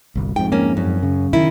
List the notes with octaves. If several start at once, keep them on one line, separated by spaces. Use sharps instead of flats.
G1 C2
F2 G#2 G5
A#3 C#4
F#2
C#3
D#3 E4